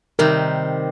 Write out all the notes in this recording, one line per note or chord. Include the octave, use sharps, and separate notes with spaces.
C3 D#3 G3 A#4